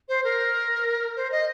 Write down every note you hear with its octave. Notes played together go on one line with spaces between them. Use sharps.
C5
A#4
C5
D#5